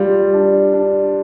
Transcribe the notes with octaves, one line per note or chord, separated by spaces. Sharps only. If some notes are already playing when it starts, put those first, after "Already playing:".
Already playing: G3 F4
D4
D4